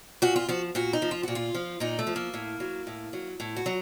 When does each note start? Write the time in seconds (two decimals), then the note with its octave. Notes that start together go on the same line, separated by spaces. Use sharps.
0.22 A#2 F#4
0.36 F4
0.48 F3 F#4
0.75 A#2 F#4
0.93 D#4
1.02 F3
1.11 F4
1.23 A#2 F#4
1.35 F4
1.55 F3
1.80 A#2 D#4
1.99 A3
2.07 F3
2.16 A#3
2.34 A2
2.60 F#3
2.87 A2
3.13 F#3
3.40 A2
3.56 F#4
3.66 F#3